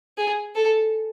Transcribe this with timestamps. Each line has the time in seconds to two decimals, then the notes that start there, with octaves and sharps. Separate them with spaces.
0.18 G#4
0.55 A4